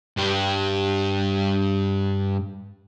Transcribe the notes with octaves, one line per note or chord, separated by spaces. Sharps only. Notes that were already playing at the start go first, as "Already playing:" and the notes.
G2 G4